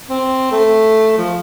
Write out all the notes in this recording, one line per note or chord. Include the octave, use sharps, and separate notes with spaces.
C4
A3
F3